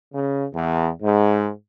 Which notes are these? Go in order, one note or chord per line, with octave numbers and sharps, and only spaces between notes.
C#3
E2
G#2